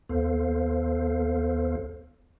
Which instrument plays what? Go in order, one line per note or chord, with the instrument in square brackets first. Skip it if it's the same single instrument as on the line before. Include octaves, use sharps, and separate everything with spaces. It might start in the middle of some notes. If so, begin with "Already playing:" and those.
[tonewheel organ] D#2 B3 A4 C5 F5